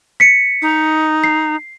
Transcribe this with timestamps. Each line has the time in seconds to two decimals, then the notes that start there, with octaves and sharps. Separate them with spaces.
0.20 B6 C#7
0.62 D#4
1.24 C7